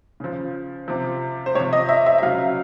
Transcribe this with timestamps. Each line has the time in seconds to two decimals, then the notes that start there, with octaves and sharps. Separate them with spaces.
0.20 C#3 F3
0.88 C3 F3
1.46 C5
1.55 C3 C#5
1.59 F3
1.73 D#5
1.89 E5
2.06 E5
2.18 E5
2.22 C#3 F#3 F5